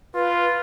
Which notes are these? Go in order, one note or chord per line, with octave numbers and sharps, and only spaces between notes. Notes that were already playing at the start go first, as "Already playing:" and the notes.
F4 B4